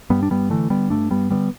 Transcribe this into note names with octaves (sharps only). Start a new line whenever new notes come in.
G2 G3 B3
D4
G2 G3 B3
D3 E3 A3
D3 G3 B3
G2 A3 D4
G2 G3 B3
D3 G3 B3